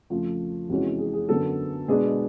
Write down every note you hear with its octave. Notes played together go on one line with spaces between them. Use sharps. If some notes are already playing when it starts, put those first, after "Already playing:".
F2 C#3 F3 A3 F4
E2 C3 E3 G#3 C#4 F#4
G#4
G#4
F#2 D3 F#3 B3 A4
B2 G#3 B3 D4 G#4